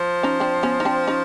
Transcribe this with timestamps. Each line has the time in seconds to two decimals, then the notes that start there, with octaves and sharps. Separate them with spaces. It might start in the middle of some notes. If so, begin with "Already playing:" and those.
Already playing: F3
0.23 C#4 D#4
0.40 C4 D4
0.63 B3 C#4
0.80 D#4
0.85 C4 D4
1.07 C#4 D#4